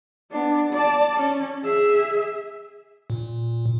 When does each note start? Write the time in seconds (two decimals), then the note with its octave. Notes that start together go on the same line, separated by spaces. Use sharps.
0.31 B3 D4
0.73 D5 A5
1.16 C#4
1.63 G#4 E5
3.10 A#2